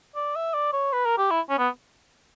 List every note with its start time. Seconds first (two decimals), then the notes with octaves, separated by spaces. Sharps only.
0.15 D5
0.36 E5
0.54 D5
0.72 C#5
0.92 B4
1.05 A#4
1.18 G4
1.30 E4
1.50 C#4
1.59 B3